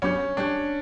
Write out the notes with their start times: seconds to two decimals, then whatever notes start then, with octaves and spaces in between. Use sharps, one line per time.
0.02 G2 F#3 B3 C#4 D4 G4
0.37 A2 G3 C#4 D4 G4